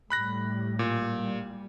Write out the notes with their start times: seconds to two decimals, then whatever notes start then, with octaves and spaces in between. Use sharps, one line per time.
0.10 A2 G3 B5 F#6 A#6
0.79 A#2
1.16 G3